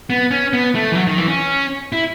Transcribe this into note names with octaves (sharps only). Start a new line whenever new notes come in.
B3
C#4
B3
A3
E3
F#3
D#3
E3
C#4
E4